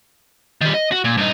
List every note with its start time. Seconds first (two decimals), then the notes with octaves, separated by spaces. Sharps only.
0.61 D#3 G3
0.74 D#5
0.92 F#4
1.04 A#2
1.18 G2 D#4